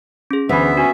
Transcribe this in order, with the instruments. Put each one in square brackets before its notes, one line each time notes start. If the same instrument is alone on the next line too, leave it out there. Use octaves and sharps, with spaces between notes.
[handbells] C#4 G#4
[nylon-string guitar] D2 [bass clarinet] E3 [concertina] B3 E5 [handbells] C5 B5
[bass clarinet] C#4 [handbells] F#4